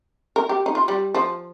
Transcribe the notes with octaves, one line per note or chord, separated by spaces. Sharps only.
A#4
G4
D#4
F4
G3
F3